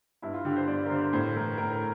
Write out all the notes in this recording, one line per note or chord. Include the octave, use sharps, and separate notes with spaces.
G2 E4
F4
D3 G4
C5
G2 D5
A#4
D3 C5
A2 C5
E3 A#4
A2 A#4